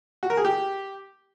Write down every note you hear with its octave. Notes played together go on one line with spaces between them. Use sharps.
F#4
A#4
G#4
G4